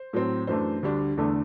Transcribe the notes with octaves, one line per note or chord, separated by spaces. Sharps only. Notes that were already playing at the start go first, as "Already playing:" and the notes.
Already playing: C5
A2 F#3 C4
F#2 E3 A3 D4 C5
D2 D3 G3 D4
E2 D3 A3 D4 A4